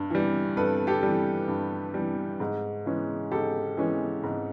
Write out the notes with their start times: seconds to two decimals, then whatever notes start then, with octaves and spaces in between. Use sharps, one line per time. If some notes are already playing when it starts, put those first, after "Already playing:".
Already playing: G2
0.10 E3 G3
0.57 G2 A4 B4
0.87 G4 A4
1.03 E3 G3
1.48 G2
1.94 E3 G3
2.40 G#2
2.86 E3 G#3 C#4
3.32 G#2 G4 A4
3.77 E3 G#3 C#4
4.23 G#2